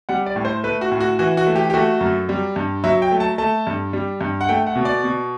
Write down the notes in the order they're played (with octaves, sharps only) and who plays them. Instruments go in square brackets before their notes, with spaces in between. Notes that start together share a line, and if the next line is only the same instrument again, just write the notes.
[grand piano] G3 F#5
D5
A2
C5
A3 B4
F#4
A2
F#4
E3 F#4
F#4
A3
G4
G4
A3 F#4
F#2
G3
G2
F#3 E5
G5
A3
A5
A3 A5
G2
G3
G2
F#5
A3 G5
F#5
B2
D5
B2